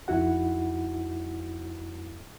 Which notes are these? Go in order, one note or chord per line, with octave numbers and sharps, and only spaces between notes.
F2 D#4 E4 F#4 F#5